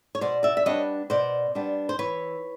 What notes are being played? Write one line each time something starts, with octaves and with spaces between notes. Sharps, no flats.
C#5
B2 C5 D5
D5 E5
E5
G3 B3 D4 C#5 D#5
B2 C5 D5
G3 B3 D4
C5
E3 B4 C#5